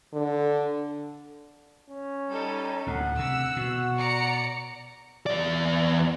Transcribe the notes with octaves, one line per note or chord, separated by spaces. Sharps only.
D3
C#4
G3 D#4 A4
D2 A2 F#5
C3 E6
B2 F#4
D5 A#5 C#7
E2 D5